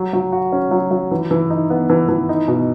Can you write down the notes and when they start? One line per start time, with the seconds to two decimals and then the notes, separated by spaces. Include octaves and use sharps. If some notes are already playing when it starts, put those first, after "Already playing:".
Already playing: F#3
0.13 F#3
0.32 F#4
0.52 C#4
0.71 F#3
0.91 F#3
1.11 E3
1.31 E3
1.50 D#4
1.70 B3
1.90 E3
2.09 E3
2.29 D#4
2.48 B2